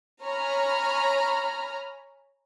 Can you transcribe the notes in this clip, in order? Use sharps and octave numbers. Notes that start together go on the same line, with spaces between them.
C#5 G#5 A#5 B5 F6